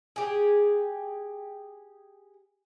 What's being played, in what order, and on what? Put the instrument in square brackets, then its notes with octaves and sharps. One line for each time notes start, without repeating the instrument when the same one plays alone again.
[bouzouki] G4 G#4